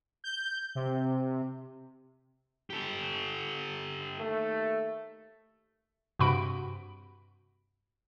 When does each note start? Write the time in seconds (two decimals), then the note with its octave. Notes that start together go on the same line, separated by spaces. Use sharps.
0.24 G6
0.75 C3
2.70 G4 A4
4.17 D#2 A3
6.19 G2 C3 F#4 B5 D7